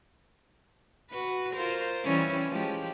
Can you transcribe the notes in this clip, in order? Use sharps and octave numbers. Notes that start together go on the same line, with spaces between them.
F#4 B4
F4 A#4 C5
E3 G3 C#4
F3 G#3 G4